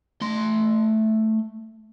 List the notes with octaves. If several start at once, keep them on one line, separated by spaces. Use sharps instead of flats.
A3 C6